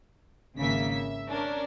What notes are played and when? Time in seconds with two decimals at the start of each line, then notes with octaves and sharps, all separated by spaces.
0.56 G#1 C#3 A#3 E5 B6
0.91 E5
1.29 C#4 D4 A#4